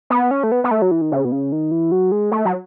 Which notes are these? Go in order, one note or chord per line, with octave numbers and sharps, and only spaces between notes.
B3
C#4
A3
B3
B3
A3
F#3
E3
D#3
C#3
B2
C#3
D#3
E3
F#3
G#3
A3
F#3